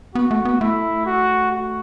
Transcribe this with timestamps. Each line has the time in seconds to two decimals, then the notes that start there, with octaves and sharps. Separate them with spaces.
0.15 B3 F#4
0.31 A3
0.45 B3
0.60 A3 E4
1.06 F#4
1.51 F#4